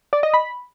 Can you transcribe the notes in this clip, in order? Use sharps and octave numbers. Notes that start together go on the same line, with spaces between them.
D5
D#5
B5